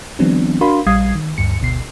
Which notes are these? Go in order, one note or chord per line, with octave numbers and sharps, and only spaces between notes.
D#3 F3 G3 B3 C4 D4
D4 F#4 A#4 F5 B5 C6
A#1 G3 F5 D#6 G#6 C7
D#3
D2 G2 C#7
G1 D2 B2 C7